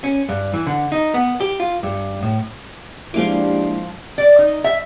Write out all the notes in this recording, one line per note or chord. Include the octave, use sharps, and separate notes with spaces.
C#4
G2
E3
D3
D#4
B3
G4
F4
G2
A2
F3 G#3 A#3 D4 E4 G4 F5 D6
D5
D#4
E5